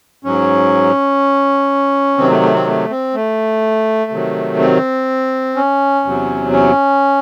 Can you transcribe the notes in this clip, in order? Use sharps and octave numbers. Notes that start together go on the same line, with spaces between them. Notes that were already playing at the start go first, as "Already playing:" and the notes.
G#2 F#3 C#4
C3 D#3 F#3 C4
A3
A3
C4
A3
C4
A3
C3 D#3 F#3
C4
C#4
E2 C3 F#3
C#4